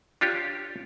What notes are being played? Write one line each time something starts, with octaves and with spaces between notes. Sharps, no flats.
D4 F4 G4 C#5